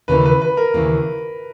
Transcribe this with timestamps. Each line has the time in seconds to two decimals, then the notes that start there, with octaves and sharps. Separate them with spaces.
0.08 D#2 C#3 E3 A#3 B4
0.26 B4
0.42 B4
0.57 A#4
0.74 D#2 C#3 E3 A#3